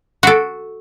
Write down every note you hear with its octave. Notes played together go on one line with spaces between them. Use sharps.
F#4 A4